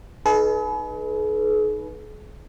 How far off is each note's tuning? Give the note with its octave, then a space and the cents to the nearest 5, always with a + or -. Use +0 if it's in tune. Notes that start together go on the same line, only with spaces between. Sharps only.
D#4 +0 G#4 +45 B4 -10